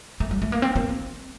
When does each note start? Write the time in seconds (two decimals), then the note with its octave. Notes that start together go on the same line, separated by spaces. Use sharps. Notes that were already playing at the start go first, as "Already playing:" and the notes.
0.20 A3
0.31 G3
0.42 A3
0.52 A#3
0.62 C4
0.76 A#3
0.89 C4